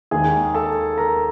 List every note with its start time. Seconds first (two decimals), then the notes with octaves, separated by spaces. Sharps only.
0.11 D#2 D#3 G#3 G#4 G#5
0.54 A4 A5
0.98 A#4 A#5